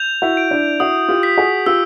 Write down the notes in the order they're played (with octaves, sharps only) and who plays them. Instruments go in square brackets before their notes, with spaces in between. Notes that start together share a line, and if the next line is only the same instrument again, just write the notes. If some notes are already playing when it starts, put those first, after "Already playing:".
Already playing: [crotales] G6 F7
[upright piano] E4 F#4
[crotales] D7
[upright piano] D4 E4
[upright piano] E4 F#4 [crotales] D#6
[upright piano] F4 G4
[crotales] B6
[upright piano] F#4 G#4
[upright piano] F4 G4 [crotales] E6